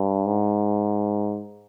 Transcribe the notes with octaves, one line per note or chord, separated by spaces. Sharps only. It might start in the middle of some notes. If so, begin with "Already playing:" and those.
Already playing: G2
G#2